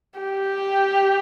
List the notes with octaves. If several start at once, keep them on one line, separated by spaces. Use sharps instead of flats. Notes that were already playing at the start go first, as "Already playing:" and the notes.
G4